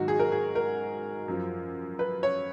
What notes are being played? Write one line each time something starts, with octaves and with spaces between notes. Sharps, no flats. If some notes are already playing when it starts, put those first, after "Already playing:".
Already playing: G#2 D#3 F#3 F#4
G#4
A#4
G#4
A#4
F#2 F3
B4
C#5